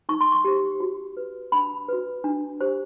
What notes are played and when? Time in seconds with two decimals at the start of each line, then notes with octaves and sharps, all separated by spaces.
0.09 D#4 C#6
0.21 C6
0.32 C#6
0.44 G4 C5
0.80 F#4
1.17 B4
1.52 D4 B5
1.88 F#4 B4
2.24 D4
2.61 G4 C5